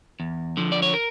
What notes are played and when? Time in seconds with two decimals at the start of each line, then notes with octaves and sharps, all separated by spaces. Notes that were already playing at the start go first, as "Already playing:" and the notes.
0.20 E2
0.57 D3 F3
0.72 D5
0.82 C#5
0.94 A#4